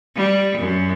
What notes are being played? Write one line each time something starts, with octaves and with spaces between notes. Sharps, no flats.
G3
F#2